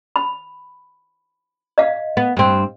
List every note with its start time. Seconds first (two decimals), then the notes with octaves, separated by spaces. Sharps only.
0.16 B5
1.78 D#5 F5
2.17 B3
2.37 G2 C4